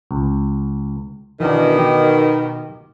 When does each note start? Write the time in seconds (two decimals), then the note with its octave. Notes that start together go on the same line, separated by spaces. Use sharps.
0.11 C#2
1.40 B2 D#3 E3 D4
1.78 G4